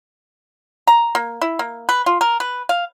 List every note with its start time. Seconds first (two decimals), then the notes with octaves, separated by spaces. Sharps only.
0.87 A#5
1.15 A#3
1.41 E4
1.59 A#3
1.89 B4
2.06 F4
2.21 A#4
2.40 B4
2.69 F5